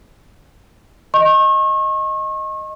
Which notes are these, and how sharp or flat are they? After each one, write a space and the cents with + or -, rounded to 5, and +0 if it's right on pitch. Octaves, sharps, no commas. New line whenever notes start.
D#5 +0 C#6 -35